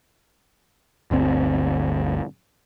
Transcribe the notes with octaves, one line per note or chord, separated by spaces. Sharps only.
G1 D2 C4